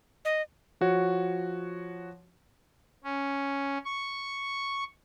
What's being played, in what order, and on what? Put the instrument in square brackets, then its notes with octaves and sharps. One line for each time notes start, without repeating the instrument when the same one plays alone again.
[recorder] D#5
[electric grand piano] F3 F#4 C#5
[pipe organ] C#4
C#6